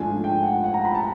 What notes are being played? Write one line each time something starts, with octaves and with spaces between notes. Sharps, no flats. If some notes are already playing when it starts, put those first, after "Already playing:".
Already playing: G#2 F3 A3 D4 G#5
G5
F#5
F#5
A#5
B5
A5